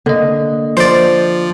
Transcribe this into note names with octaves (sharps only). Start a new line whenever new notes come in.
D3 A#3 D#5
F3 C5 D5